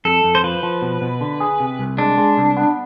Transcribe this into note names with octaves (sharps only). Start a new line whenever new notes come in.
F2 A4
F2
C5
F3 B4
F3
B2
B2
D3
G#4
C3
C2
G#3 D4
G#3
C2
B3